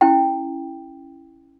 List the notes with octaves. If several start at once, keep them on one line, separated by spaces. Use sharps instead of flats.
C#4 E4 G5